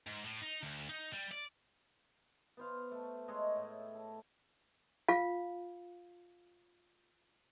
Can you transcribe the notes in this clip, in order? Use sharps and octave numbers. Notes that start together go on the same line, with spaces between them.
G#2
A2
D#4
D2
D#4
G3
D5
B3 C5 F5
A3
G#3 A3 C#5 D#5
A2
A5
F4 F5